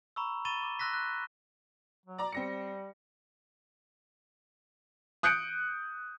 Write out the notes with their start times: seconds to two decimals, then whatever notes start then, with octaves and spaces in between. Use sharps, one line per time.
0.16 A#5 B5 C#6 E6
0.45 B5 C#6 A6 D#7 E7 G7
0.63 D6
0.79 C6 E6 F#6 A#6 B6
0.94 F#6
2.06 F#3
2.18 D5 A#5
2.32 G3 C4 A#6 C#7
5.23 D#6 F#6 G6 C#7 D7